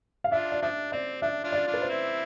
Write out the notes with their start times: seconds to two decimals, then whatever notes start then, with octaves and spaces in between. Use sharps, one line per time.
0.24 F5
0.32 D4 F4 E5
0.52 D5
0.62 F3 D4 E5
0.92 C4 D5
1.22 F3 D4 E5
1.45 D4 F4
1.52 D5
1.67 D4 F4
1.74 B4
1.82 C5
1.89 C4 E4